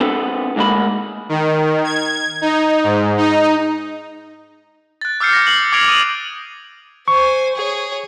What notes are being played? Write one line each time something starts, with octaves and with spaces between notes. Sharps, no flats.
B3 C4 D4 A4 B4
D2 G#2 G#3 A#3 B5
D#3
G#6
D#4
G#2
D#4
F#6 A6
D6 E6 F6 G6 C7 C#7
A#6 C#7
F#7
D6 F6 G#6 C7 D7 F7
D6 D#6 D#7 F7 F#7
C5 G#5 C#6
G#4 C#5